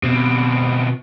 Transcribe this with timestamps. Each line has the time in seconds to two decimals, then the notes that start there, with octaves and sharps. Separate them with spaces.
0.03 B2 C4